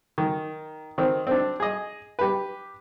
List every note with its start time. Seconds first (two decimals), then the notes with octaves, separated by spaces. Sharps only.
0.18 D#3
0.98 D#3 C4
1.27 C4 D4
1.60 G#4 D#5
2.19 G4 B4